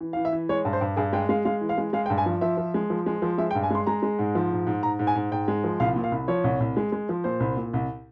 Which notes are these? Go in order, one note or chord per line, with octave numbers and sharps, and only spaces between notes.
E3
E3 F5
E5
E3
G#3 C#5
G2
C5
G2
G2 G#4
G#3 G5
G#3 F5
G#3 F5
E3
F5
G#3
G#3 F5
G5
G2
G#5
F3
F3 E5
F3
G#3
F3
G#3
F3
G#3 E5
G5
G2
G#5
G#3 C6
G#3 A#5
G#3
G#2
F3
G#2
G#2
G#2 A#5
G#2
G#5
G#2
G#2 G5
G#3
F3
C2 F5
A#2
F5
C2
F3 C#5
C2
C2
G#3
G#3
F3
A#2 C5
C2
A#2
C2